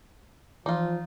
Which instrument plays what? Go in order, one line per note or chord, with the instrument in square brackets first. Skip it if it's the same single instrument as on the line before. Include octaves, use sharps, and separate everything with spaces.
[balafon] E3 [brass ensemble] F3 [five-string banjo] D#4 F4